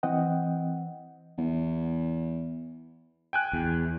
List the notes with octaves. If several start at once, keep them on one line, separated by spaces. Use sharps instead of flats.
E3 C4 D#5 F#5 G5
E2
G5 G#5 F#6
E2